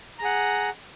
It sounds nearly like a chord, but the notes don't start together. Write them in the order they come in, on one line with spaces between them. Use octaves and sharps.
A#5 G#4 F#5